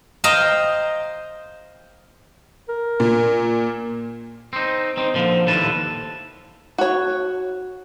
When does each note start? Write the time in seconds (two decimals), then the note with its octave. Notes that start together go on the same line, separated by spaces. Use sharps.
0.24 C5 D#5 F5 G5 A#5
2.69 A#4
3.00 A#2
4.53 C4 D#4
4.97 C4 D#4
5.14 A#2 D3 F3
5.47 D#2 A2 D3 G3 B4 A5
6.78 F#4 C#5